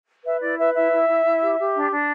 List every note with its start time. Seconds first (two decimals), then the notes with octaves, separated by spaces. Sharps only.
0.25 B4 E5
0.41 E4 D5
0.58 B4 E5
0.74 E4 E5
0.92 E4
1.08 E4
1.24 E4
1.41 G4
1.58 G4
1.74 D4
1.90 D4